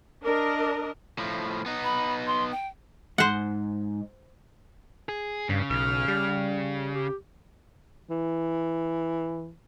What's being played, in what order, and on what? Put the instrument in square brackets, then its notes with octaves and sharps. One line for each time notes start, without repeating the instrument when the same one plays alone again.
[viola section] D4 A#4 D#5
[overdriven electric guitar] A2 F3
B3 D#4
[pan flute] B5
C6
G5
[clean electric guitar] G#2 [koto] C5 F#5
[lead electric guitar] G#4
[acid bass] G2 [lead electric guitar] C#3
[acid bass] B1 [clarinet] F6
[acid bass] G3
[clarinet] G4
[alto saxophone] E3